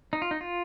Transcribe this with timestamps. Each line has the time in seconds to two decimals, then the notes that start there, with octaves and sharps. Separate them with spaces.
0.13 D#4
0.22 F4
0.31 D#4
0.41 F4